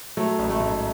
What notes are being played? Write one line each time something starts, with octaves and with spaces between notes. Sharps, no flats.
F#3 A3
A1
A3
G#2